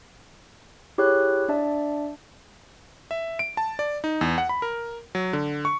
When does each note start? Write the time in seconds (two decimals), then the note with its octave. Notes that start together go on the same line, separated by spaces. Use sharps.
0.98 E4 G4 G#4 C#5 F#6
1.49 D4 D5 E5 A5
3.11 E5
3.39 D7
3.57 A5
3.79 D5
4.04 D#4
4.21 E2
4.38 F#5
4.49 B5
4.62 A#4
5.15 F#3
5.33 D3
5.65 C#6